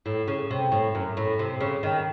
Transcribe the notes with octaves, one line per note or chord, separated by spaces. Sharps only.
A2
C#3
C3
A2
F#2
A2
C3
C#3
D#3